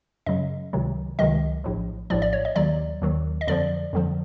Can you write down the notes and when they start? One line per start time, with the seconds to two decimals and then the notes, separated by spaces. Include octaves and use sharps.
0.26 F#2 C#3 F#3 D#5
0.73 C#2 C3 D#3 F#3
1.19 C#2 C3 D#3 F#3 D#5
1.64 A#1 A2 F3
2.10 A#1 A2 F3 D5
2.22 D5
2.33 C#5
2.45 D#5
2.56 D#2 D#3 F#3 D5
3.02 D#2 D#3 F#3
3.41 D#5
3.47 F2 D3 F3 D5
3.93 F2 D3 F3